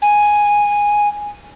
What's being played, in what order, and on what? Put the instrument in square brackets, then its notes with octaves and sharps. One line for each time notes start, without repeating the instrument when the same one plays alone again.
[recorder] G#5